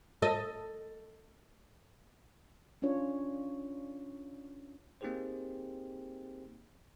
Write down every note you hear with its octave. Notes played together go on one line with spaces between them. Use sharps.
A4 D#5
C#4 D4 F4 C#5
A#3 C4 D#4 G4 G#4 C5